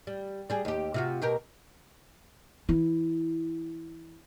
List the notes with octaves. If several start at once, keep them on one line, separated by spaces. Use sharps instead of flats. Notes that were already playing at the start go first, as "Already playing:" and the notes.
G3
G3 G#4
D#2 G4
C3 F4 F#4
B2 G4 A#4
E3 E4